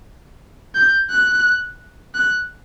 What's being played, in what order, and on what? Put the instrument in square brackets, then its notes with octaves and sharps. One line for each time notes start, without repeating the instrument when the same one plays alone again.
[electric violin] G6
F#6
F#6